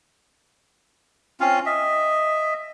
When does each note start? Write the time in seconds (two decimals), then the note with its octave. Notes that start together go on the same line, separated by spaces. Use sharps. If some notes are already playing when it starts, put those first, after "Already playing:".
1.40 C4 C#4 F4 F5
1.66 D#5 E5